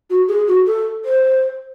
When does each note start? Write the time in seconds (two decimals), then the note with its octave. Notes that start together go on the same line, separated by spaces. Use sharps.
0.10 F#4
0.29 G#4
0.48 F#4
0.66 A4
1.05 C5